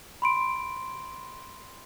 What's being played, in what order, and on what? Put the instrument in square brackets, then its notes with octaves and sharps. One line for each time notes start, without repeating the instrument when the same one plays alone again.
[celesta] B5 C6 D7